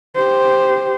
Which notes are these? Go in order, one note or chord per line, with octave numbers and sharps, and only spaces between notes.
G4 C5